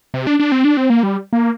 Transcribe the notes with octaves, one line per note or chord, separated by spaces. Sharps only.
C3
D4
D4
C4
D4
C4
A#3
G3
A#3